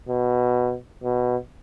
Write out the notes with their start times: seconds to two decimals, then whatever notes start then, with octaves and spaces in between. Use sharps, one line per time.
0.09 B2
1.03 B2